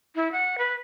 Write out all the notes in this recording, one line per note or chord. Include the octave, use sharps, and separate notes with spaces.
E4
F#5
B4